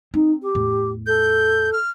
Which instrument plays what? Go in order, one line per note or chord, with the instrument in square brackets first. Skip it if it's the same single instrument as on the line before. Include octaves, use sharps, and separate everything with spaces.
[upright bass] C4 [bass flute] D#4
[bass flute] G4
[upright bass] E2 A2
[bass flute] A4 [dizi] G6
[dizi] F6